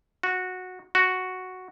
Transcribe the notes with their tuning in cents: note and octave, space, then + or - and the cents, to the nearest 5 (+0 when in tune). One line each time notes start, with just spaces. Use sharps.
F#4 -10
F#4 +0